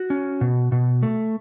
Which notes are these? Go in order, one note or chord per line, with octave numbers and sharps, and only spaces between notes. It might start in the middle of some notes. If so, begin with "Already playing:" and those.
Already playing: F#4
C#4
B2
B2
A3